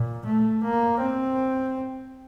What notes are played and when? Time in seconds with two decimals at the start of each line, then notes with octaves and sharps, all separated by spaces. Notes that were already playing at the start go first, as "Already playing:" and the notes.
Already playing: A#2
0.25 A3
0.64 A#3
1.00 C4